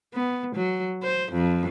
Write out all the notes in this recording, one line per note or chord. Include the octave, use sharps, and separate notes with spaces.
B3
F#3
C5
F2